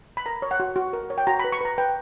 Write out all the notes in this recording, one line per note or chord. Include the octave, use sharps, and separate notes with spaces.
B5
A#4 A#5
C#5
F#5
F#4
F#4
A#4
C#5
G5
F#4 A#5
B4 B5
C#6
B4 A#5
B4 G5